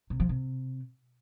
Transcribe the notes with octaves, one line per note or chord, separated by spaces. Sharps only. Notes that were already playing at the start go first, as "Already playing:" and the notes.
C3
F3
C3